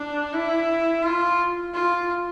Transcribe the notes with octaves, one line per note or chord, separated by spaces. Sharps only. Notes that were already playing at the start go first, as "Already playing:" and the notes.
Already playing: D4
E4
F4
F4